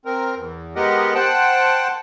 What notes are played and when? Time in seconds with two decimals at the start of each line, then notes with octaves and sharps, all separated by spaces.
0.05 C4 A#4
0.36 E2
0.76 G#3 B3 G4 A#4 D#5 F#5
1.15 C5 F#5 G5 A5 F#6